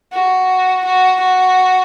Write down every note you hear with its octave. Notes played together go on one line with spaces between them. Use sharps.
F#4
F#4
F#4